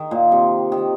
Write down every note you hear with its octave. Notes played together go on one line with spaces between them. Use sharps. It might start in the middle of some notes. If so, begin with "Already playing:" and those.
Already playing: D#3
A#2
C3
D#3